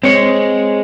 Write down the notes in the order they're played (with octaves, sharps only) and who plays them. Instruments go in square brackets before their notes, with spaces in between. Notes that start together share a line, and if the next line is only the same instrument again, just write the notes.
[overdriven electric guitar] G#3 [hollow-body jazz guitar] C4 C#5